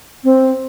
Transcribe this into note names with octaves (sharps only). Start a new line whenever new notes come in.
C4